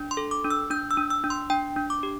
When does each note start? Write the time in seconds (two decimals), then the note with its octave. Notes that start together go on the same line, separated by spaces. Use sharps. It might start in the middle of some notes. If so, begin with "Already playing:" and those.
Already playing: D4
0.11 C6
0.17 A4
0.31 D6
0.45 D4
0.50 E6
0.71 D4 G6
0.91 E6
0.97 D4
1.10 E6
1.24 D4
1.30 C6
1.50 D4 G5
1.76 D4
1.90 D6
2.03 G4